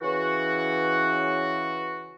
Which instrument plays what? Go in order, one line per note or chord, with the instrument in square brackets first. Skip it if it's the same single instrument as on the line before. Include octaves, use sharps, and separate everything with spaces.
[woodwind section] C#3 E3 F#4